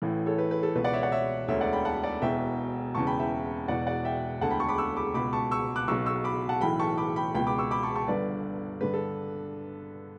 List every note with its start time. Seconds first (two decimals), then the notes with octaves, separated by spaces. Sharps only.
0.02 A1 A2 E3
0.26 A4 C#5
0.38 B4
0.51 B4
0.63 A4
0.75 C#2 B2 B4
0.84 D5 F#5
0.93 C#5 E5
1.03 D5 F#5
1.12 C#5 E5
1.48 E1 D2 D3 C#5 E5
1.61 D5 F#5
1.73 G5 B5
1.85 F#5 A5
2.03 D5 F#5
2.22 E1 E2 B2 E5 G5
2.95 E1 E2 C#3 A5 C#6
3.07 G5 B5
3.19 E5 G5
3.68 E1 E2 B2 D5 F#5
3.87 D5 F#5
4.05 E5 G5
4.41 E1 D2 D3 F#5 A5
4.51 G5 B5
4.60 A5 C#6
4.69 B5 D6
4.78 C#6 E6
4.96 B5 D6
5.14 C#2 B2 B5 D6
5.33 A5 C#6
5.51 C#6 E6
5.76 D6 F#6
5.88 B1 B2 C#6 E6
6.06 C#6 E6
6.24 B5 D6
6.49 F#5 A5
6.61 B1 A2 E3 G5 B5
6.80 A5 C#6
6.98 B5 D6
7.16 G5 B5
7.35 C#2 B2 G5 B5
7.47 B5 D6
7.58 C#6 E6
7.71 B5 D6
7.83 A5 C#6
7.96 A5 C#6
8.08 G1 G2 D3 B4 D5
8.81 G2 D3 B4
8.94 A4